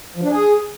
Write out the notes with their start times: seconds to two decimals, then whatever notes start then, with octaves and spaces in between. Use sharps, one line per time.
0.16 F3
0.23 D4
0.30 G#4